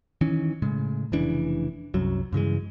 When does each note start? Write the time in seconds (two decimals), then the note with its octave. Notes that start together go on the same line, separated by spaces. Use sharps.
0.21 D#3 E3 C#4
0.62 A2 C#3 G#3
1.12 F1 C#3 E3 D4
1.94 C2 F#2 F#3
2.33 G2 C#3 E3 G#3